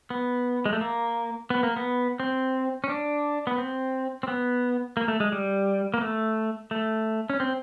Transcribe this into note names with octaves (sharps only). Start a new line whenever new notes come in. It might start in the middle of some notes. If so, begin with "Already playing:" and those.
B3
G#3
A3
A#3
B3
A#3
B3
C4
C#4
D4
B3
C4
C4
B3
A#3
A3
G#3
G3
A#3
A3
A3
C#4
C4